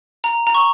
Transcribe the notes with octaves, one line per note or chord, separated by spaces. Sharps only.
A#5
A#5
C#6